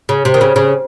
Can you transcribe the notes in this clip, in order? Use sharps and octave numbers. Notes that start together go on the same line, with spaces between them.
C#3
C3
D#3
C#3
C#3